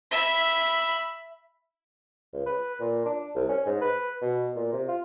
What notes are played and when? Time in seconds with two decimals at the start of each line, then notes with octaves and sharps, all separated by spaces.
0.11 E5 B5
2.33 C#2
2.46 B4
2.80 A#2
3.05 D4
3.35 C2
3.49 C#4
3.66 G#2
3.81 B4
4.21 B2
4.55 A#2
4.73 C3
4.88 F4